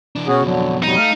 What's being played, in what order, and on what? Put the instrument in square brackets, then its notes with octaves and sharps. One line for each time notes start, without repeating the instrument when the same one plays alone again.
[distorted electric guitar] E3 D4
[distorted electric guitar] B2 [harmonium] C#4 F#4 G#4
[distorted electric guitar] F2 B2 [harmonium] D3 F#3
[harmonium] F#3 G3 [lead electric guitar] D#4
[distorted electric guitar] A3 [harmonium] F5